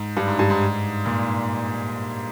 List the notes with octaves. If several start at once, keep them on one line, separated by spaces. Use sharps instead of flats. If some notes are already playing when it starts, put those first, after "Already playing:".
Already playing: G#2
G2
G#2
G2
G#2
A#2